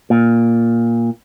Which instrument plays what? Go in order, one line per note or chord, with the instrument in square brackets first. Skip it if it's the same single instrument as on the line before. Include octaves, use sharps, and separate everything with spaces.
[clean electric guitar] A#2